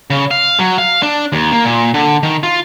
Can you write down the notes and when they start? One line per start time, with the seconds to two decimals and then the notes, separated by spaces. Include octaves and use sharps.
0.10 C#3
0.31 F5
0.59 F#3
0.78 F5
1.02 D4
1.32 D#2
1.52 A#3
1.64 A#2
1.94 D3
2.23 D#3
2.43 F4